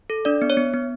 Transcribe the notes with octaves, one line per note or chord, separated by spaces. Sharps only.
A4
D4 D5
B3
C#5
B3
B3